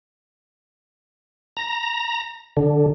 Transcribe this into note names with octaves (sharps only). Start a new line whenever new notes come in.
A#5
D3